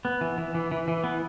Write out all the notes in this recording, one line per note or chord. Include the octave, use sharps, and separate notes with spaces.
B3
E3
E3
E3
E3
E3
B3